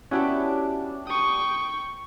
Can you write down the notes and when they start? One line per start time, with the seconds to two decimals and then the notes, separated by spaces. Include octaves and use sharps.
0.11 B3 C#4 D4 E4 F#4 G4
1.07 G5 C#6 D#6